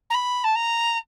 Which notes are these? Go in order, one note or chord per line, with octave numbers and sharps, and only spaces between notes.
A#5
B5
A5
A#5